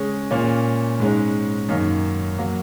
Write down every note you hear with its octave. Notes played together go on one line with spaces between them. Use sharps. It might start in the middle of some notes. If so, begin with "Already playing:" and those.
Already playing: C#3 G#3 C#4
A#2 A#3 C#4
G#2 G#3 C#4
F#2 D#3 A#3 C#4
F#3 A#3